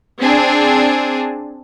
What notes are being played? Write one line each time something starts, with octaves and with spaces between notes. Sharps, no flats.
C4 D4 G#4